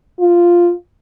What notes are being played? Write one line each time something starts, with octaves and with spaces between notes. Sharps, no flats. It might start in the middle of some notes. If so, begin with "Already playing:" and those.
F4